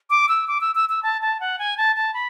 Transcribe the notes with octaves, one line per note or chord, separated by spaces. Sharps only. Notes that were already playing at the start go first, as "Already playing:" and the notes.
D6
E6
D6
E6
E6
E6
A5
A5
F#5
G#5
A5
A5
B5